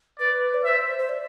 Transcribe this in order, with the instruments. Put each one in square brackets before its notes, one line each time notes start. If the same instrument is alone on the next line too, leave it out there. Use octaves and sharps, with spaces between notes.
[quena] B4 [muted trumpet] D5
[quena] D5
[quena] C5 [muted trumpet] E5
[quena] C5
D5